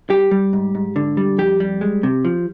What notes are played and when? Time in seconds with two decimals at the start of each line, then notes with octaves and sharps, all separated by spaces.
0.10 G3 G4
0.31 G3
0.53 G#2
0.75 G#2
0.96 D3
1.17 G3
1.38 F2 G4
1.60 G3
1.81 G#3
2.03 C3
2.25 F3